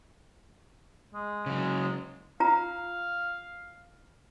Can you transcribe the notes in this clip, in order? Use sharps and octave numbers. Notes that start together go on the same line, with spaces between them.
G#3
C#3 F#3
F4 F5 A#5